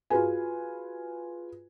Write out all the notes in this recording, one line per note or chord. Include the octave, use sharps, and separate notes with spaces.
F4 F#4 G#4 B4 G#5